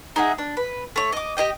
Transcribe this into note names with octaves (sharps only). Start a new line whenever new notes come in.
D#4 G#4 E5 F#5
D4
B4
A3 C#5
D#5 D6
G4 G#4 D#5 G5